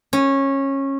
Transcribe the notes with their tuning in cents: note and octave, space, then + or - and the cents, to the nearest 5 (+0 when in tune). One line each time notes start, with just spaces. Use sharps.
C#4 -20